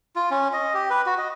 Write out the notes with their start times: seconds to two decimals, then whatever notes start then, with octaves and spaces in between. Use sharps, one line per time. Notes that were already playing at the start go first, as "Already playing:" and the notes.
0.16 F4
0.31 C#4
0.53 D#5
0.74 G4
0.90 B4
1.06 F#4
1.18 D#5